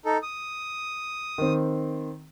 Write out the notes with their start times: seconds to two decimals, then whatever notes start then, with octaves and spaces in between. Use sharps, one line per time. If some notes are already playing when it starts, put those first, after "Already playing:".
0.05 D#4 A4
0.23 D#6
1.38 D#3 C4